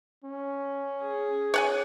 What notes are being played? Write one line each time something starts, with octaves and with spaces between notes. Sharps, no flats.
C#4
G#4
C#5 F#5 G#5